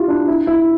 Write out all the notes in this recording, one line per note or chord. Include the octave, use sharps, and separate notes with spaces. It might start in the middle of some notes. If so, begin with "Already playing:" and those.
Already playing: E4 F4 G4
D4
E4
E4